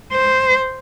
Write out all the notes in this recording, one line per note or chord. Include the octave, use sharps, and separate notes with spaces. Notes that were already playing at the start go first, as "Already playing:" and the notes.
C5